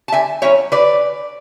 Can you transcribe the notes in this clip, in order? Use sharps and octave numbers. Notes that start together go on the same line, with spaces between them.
A5
D3 E5 G#5
F#3 C#4 E4 C#5 E5
D3 B4 D5